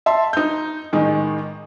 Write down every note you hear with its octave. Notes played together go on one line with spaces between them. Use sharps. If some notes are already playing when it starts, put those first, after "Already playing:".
E5 A5 C6
D#4 G6
A1 D#3 G#3